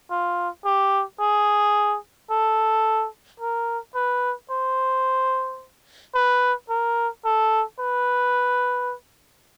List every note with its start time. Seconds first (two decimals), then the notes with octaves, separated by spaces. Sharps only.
0.11 F4
0.66 G4
1.20 G#4
2.30 A4
3.40 A#4
3.95 B4
4.51 C5
6.15 B4
6.70 A#4
7.25 A4
7.80 B4